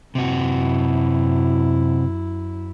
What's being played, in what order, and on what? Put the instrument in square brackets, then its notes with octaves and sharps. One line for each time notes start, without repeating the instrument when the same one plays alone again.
[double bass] F#2 E4 [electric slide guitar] C3 F#4